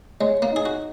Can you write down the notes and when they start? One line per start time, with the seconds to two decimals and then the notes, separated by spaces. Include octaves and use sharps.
0.20 G#3 C#5
0.42 A#3
0.50 D#4
0.56 G#4
0.65 F#4